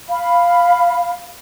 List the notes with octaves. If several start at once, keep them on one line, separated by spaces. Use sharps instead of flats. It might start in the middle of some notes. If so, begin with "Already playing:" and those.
F5 B5